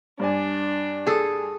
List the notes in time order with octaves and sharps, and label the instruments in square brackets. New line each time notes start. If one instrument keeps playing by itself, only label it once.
[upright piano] G2 D5 G#5 [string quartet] D4
[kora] G#4 A4